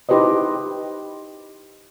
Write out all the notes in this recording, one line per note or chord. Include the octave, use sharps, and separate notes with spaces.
D#4 E4 G4 B4 C5 D#5